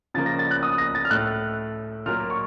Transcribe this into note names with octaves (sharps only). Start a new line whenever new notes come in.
C#3 F3 A#3 A6
A#6
A6
F#6
D#6
A#6
A6
F6
A2 A3 F#6
A#2 F#3 A#3 F6
C#6